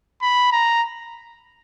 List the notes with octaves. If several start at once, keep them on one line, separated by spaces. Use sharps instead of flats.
B5
A#5